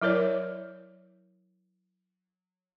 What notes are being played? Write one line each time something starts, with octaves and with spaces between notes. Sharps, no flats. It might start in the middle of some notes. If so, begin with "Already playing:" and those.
F#3 E4 A#4 C#5 D5